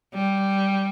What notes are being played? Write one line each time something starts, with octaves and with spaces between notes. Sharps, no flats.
G3